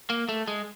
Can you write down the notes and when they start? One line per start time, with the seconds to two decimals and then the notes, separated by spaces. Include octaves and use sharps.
0.10 A#3
0.29 A3
0.48 G#3